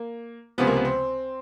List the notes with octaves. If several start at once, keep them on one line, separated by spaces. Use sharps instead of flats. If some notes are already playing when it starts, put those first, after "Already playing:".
Already playing: A#3
C#2 C3 F3 B3
A#3
B3
C4